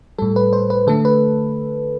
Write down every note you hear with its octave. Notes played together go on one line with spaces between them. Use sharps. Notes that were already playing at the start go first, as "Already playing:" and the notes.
A2 G3 A4
B4
C5
B4
D3 A3 A4
B4